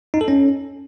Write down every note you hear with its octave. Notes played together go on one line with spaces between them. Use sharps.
D#4
A4
C#4